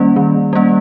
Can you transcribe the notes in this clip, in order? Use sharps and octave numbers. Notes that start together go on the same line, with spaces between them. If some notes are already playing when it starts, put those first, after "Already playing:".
Already playing: D#3 G3 A#3 C#4 D5
D#3
G3 A#3 C#4